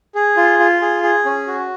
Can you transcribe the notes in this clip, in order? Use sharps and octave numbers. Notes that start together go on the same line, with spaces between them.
G#4
F4
F4
G#4
G#4
C#4
F#4